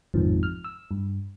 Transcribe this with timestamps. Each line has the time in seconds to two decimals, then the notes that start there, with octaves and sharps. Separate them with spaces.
0.14 A1 F2 G#2 C3 D#3 F3
0.43 F6
0.64 E6
0.91 G2